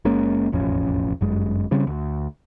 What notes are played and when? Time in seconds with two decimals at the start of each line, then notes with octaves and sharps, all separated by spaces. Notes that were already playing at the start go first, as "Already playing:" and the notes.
0.05 F#1 G#3 A#3 C#4
0.52 E1 A1 F2 C#4
1.21 G1 F#2 G#3
1.71 C#3 G3 C4
1.87 D2